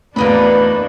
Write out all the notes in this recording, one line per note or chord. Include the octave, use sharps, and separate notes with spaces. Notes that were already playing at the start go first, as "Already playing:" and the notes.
E2 A2 A#3 D4 D#4 F#4 B4 B5